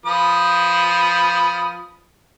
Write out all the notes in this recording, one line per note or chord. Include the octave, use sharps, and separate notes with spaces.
F3 B4 D#6